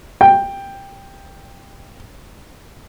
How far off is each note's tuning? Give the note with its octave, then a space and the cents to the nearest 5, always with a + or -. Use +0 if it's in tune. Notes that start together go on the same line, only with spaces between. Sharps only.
G5 +10